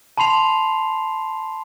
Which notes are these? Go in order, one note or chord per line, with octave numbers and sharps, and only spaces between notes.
A5 B5 C6 C7 F7